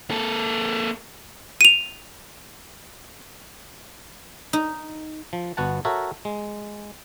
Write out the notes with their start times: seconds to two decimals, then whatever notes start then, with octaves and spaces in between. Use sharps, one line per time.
0.10 A#3 A4
1.61 D#7 F7
4.53 D#4
5.33 F3
5.57 G1 B3 F#4 F#5 A5
5.85 F#4 A4 A#4 C#5 E5
6.25 G#3